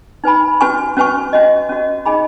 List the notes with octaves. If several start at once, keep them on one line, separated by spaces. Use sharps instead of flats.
D#4 B4 G#5 B5
C#4 F#4 B4 G#5 C#6
C#4 F#4 B4 G#5 C#6
C#4 F#4 D#5
C#4 F#4 D#5
D#4 G#4 D#5 G#5 B5